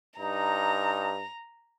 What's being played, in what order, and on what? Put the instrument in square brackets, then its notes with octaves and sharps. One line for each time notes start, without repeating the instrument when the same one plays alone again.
[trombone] G2 [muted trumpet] D#4 [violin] A#5